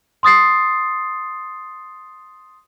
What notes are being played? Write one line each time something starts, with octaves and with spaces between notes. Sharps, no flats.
C6 D#6 A6 C7